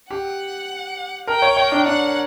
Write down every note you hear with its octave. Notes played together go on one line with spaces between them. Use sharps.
G4 F#5
A#4 G5
C#5
C#5
D4
D4 F#5